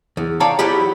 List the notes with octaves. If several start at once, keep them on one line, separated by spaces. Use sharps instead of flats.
E2
C#5 D5 F5 G5 A5 A#5
E2 F3 F#3 E4 G4 B5